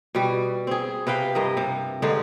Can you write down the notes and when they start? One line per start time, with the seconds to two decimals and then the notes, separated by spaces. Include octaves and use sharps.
0.15 B2 G3
0.67 C4 G#4
1.07 C3 B4 F5 G5
1.35 G2 A#4 D#5
1.57 C3
2.02 G2 D3 G#3 D#4